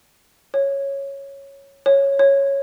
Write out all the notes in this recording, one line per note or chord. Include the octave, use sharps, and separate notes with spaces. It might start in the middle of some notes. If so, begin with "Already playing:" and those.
C#5
C#5
C#5